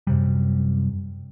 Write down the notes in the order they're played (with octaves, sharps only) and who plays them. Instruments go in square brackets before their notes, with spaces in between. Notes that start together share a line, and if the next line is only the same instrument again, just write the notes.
[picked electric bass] F#2 C3 G3